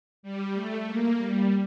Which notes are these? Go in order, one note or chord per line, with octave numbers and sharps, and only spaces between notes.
G3
A3
A#3
G3